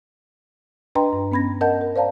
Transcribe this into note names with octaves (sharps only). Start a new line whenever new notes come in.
D4 B4 D#5 G5 A#5 C6
G2
B3 C#4 B5 G#6 A#6
A#4 D#5 F#5 A5 G6
A#4
C5 D5 F5 A5 A#5